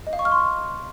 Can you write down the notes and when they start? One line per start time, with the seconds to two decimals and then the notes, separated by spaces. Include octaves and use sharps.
0.07 D#5
0.13 F5
0.19 C#6
0.25 F6
0.32 C6